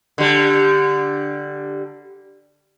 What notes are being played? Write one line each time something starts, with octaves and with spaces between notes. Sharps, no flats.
D3 G3